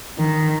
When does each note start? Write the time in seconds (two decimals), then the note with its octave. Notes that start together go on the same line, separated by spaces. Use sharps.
0.18 D#3